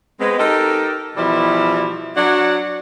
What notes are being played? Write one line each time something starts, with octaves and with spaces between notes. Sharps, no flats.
G#3 B3 C4
D#4 G4 A4 A#4 D#5
B2 E3 F3 G3 E4 F#4
F#3 D4 F#5